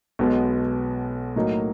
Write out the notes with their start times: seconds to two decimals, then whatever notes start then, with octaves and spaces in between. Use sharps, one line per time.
0.19 B1 B2 G#3 B3
1.36 A2 F#3 A#3 D#4